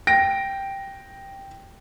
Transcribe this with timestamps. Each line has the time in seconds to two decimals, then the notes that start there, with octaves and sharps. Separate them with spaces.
0.07 G5 A#6 D7